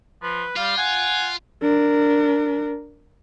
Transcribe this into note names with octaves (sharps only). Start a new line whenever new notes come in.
F3 B4
G3 F4 F5
F#5 G#5
D4 A#4